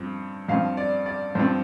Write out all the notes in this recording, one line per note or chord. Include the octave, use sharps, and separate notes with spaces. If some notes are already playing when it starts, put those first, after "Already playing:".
Already playing: G2 F3 C4
G2 F3 C4 F5
D5
D5
G2 F3 C4 C5